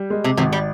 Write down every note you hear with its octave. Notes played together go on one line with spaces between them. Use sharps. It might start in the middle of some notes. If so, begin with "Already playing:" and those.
Already playing: G3
G#3
C3
G#1 C3
G3